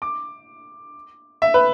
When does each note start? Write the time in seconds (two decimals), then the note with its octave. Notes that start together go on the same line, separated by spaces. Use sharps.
0.02 D6
1.42 E5
1.54 B4